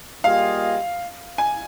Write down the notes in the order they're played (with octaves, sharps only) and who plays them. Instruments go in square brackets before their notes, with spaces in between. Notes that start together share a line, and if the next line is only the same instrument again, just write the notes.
[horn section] G3 A#3 F4 G#4 D#5 [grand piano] F5
[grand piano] G#5